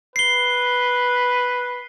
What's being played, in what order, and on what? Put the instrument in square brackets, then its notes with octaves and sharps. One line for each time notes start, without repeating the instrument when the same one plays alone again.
[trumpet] B4 [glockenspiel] C7 G7